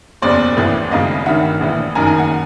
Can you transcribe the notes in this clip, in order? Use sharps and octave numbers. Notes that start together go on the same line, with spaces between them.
F#1 E2 B2 C5 D5
A1 A2 E3
G#1 F#2 C#3 D#5 F5
A1 G2 D#3 E5 F#5
A#1 A2 E3
F#1 F#2 D#3 G#5 A#5
G#5 A#5
F#5 G#5